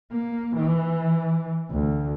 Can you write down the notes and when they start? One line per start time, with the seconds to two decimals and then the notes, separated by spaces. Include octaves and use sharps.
0.12 A#3
0.57 E3
1.70 D2